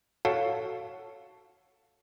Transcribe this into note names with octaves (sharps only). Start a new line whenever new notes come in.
F#4 A4 C#5 F5 F#5 A5